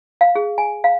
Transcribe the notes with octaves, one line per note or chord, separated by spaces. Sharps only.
F5
G#4
G#5
F5